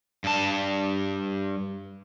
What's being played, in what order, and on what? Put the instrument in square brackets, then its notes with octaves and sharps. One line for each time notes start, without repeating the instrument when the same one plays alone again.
[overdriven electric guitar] G2 A5